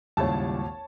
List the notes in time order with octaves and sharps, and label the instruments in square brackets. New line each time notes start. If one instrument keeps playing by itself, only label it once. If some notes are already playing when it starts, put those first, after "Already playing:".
[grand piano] G#1 D#2 A#2 [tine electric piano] C#3 G3 E4 [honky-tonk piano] C#5 A5